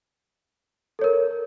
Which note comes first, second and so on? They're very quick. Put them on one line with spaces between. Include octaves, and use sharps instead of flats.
A4 C#5 A#4